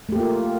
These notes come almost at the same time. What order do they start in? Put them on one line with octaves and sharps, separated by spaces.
A3 G4 A#3 F4